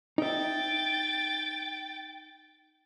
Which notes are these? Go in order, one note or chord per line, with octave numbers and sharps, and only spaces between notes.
D#4 E5 G5 A6